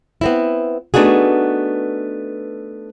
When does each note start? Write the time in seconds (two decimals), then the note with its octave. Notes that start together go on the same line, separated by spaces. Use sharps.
0.21 B3 C4 E4
0.94 A3 B3 D4 D#4 F#4 G#4